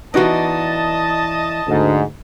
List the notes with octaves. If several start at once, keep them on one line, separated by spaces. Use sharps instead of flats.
E3 B3 D#4 F#4 D5 D#5 A5
D2 G#2